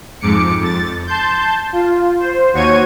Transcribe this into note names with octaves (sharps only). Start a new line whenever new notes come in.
F2 G#2 D6 C#7
F2 A6
A5 C6 G6
F4
C5
D#2 F#4 C#5 C#6 G#6 D#7